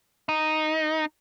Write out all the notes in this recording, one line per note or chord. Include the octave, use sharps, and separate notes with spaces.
D#4